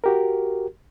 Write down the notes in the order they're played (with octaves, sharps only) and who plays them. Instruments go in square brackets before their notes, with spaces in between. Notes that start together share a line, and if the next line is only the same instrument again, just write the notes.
[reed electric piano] F#4 G4 A#4